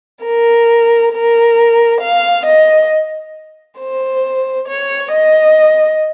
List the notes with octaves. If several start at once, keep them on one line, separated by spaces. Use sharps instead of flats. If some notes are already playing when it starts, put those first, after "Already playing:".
A#4
A#4
F5
D#5
C5
C#5
D#5